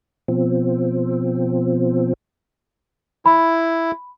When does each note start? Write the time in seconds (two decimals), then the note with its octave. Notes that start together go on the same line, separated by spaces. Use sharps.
0.28 B2 F3 C4
3.26 E4 B5